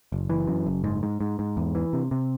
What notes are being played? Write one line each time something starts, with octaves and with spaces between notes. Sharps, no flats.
F#1
E3
F#2
F#1
G#2
G#2
G#2
G#2
E2
E3
C3
C3